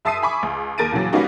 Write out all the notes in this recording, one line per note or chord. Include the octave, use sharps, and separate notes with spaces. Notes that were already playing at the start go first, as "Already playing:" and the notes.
F#2 E5 A5 D#6 C7 D#7
E5 G#5 B5 C#6 D6
C#2
D#2 A#4 A6 D7 D#7
A#2 C#3 E3 F#3
G3 A#3 B3 C#4 D#4 F#4